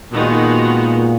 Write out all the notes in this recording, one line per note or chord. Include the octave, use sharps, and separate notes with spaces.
A#2 D#3 G#3 B3 D#4 F#4